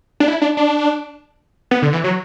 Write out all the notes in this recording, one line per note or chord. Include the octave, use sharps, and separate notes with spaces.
D4
E4
D4
D4
B3
D3
E3
F#3